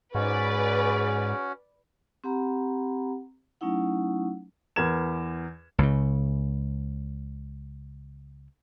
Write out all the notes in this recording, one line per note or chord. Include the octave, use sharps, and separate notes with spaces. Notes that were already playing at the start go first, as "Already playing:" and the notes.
G#2 C#4 F#4 G#4 B4 D5
C4 G4 F#5 A#5 B5
F#3 A3 C#4 D#4 E4 F#5
E2 E3 A#4 G#6 E7
C#2 C#3